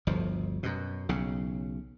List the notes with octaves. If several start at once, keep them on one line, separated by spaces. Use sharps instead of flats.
G1 D2 F3
F#2 B2
B1 C#3